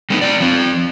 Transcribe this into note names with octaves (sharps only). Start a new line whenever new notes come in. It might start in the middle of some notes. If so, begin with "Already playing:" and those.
G3 A3 B3 D4 D#4
G3 C4 D5
F3 C4